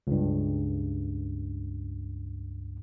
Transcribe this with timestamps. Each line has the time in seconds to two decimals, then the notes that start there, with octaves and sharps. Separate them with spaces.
0.07 C#2 G2